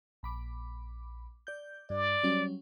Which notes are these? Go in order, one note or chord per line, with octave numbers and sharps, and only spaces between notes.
A#1 B5 D6
D5 G6
G2 D5
F#3 G3 C#4